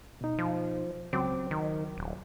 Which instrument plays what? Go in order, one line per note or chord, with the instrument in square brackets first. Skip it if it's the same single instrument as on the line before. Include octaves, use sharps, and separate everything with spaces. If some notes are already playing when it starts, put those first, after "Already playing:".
[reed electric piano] B2 D#4
[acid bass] F3
[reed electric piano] C#2 F#3 D6 [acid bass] C4
[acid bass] D#3
D#1